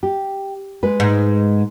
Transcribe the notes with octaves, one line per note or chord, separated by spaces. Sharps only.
G4
G#3 B4
G#2